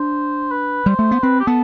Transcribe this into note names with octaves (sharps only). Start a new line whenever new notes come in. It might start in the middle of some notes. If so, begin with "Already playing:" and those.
Already playing: D4 C5
B4
G3 C5
A3
B3
C4 B4
G4
B3 A4